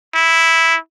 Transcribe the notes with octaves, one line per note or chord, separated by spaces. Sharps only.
E4